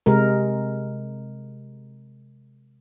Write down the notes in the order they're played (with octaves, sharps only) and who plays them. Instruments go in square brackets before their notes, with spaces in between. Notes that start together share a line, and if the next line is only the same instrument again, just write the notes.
[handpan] C3 G#3 A#4